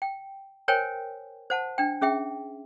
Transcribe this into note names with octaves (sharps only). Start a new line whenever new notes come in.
G5
A#4 C5 C#5 G5 G#5
C5 F#5 A5
D4 G5
C#4 G#4 E5 G5